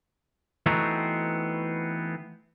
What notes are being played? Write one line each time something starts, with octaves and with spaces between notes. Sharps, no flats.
E3 A3 B3 C4 D#4 F#4